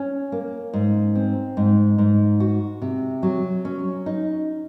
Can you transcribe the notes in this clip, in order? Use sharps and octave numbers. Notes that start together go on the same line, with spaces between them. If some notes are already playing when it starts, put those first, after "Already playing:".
Already playing: C#4
A#3
G#2
C4
G#2
G#2
F#4
C3
F#3
C#4
D#4